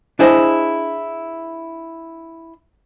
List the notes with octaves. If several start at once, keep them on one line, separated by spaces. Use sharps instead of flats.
D4 E4 G#4 C5 C#5 D#5